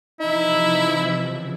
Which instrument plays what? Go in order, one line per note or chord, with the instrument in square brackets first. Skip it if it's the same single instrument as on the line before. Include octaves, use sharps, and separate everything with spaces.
[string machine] C3 E3 F3 [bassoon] D#4 [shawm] E4
[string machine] C#3